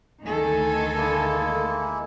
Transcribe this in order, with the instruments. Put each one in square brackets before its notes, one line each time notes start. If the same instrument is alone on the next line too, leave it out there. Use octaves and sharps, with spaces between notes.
[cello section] D2 D#3 A4 [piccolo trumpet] G#5
[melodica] G#3 A#3 E4